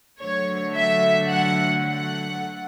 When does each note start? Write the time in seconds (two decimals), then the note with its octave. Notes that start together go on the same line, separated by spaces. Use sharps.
0.20 D3 F#3 A3 C#5
0.75 E5
1.29 F#5
1.84 F#5
2.37 A3